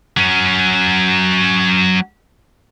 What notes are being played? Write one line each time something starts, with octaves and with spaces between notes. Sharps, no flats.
F#3 C#4